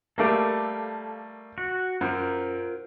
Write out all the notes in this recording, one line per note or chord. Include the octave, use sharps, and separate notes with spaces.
G3 A3 A#3 A4 F5 D6
F#4
F#2 F4 A#4 C5